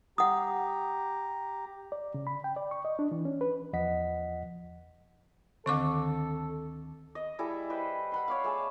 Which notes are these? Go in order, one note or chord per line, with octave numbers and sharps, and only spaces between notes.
G4 F#5 A#5 D#6
D5
C#3
B5
G5
D5
C#6
D#5
D4
E3
C#4
B4
E2 F3 D#5 F#5 B6
D2 D3 D#3 C4 A4 C#6 D6
D#5
G3 E4 G#4 A4
B4 C5 D#5 G5
F#5 B5 C6
C#5 D5 F5
A3 G#4 A5